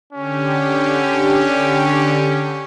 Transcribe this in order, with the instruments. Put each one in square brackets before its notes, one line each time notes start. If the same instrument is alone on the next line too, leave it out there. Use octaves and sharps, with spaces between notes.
[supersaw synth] D3 G4 [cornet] C#4